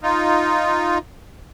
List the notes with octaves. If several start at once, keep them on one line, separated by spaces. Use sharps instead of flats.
D#4 F4